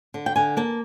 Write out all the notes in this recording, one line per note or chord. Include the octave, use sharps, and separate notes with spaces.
D3
G5
D3 G#5
A#3 A5